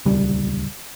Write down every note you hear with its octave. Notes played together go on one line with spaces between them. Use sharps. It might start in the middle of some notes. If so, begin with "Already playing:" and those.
D#1 C#2 G3